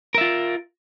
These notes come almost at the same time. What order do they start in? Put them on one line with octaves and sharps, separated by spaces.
A#4 E5 F4